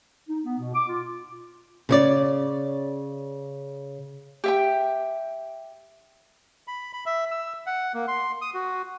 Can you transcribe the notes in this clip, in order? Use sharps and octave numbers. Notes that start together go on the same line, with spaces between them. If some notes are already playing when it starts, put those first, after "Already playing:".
D#4
B3
B2
D6
F4
C#3 C#5 D5
G4 E5 G5
B5
B5
E5
E6
F#5
A#3
C6
D#6
F#4